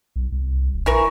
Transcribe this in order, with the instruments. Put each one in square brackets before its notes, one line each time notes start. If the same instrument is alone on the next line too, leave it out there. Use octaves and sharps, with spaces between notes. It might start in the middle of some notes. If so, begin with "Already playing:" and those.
[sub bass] B1
C2
D#1
[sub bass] A#1 [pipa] E3 A#4 C#6